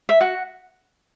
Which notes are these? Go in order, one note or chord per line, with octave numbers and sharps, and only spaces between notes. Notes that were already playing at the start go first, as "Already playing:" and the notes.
E5
F#4 F#5